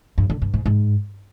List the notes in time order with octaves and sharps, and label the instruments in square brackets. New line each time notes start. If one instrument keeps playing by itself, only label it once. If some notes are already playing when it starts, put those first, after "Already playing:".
[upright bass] G2
D3
G2
G#2
G#2